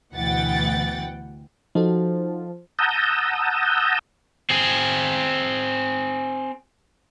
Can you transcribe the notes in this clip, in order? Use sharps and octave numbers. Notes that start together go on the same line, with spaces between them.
D2 B2 E3 F#5 G5 A6
F3 D#4 F#4 A4
F#5 A5 A#5 D#6 E6 G6
C4 G#4